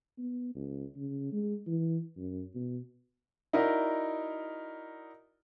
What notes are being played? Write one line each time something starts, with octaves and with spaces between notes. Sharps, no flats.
B3
C#2
C#3
G#3
E3
F#2
B2
D#4 E4 F#4 A#4 D5 D#5